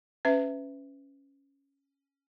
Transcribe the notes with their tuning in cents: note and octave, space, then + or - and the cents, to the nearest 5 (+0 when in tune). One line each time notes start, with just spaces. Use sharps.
C#4 +0 B4 +30 E5 +0